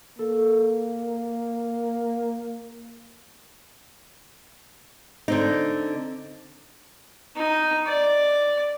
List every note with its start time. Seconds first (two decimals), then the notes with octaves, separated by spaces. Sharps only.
0.19 A#3 A4
5.28 D3 C4 D#4
7.36 D#4
7.86 D5